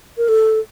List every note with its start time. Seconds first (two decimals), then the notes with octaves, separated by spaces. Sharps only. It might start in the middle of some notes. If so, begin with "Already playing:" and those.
0.18 A#4
0.28 A4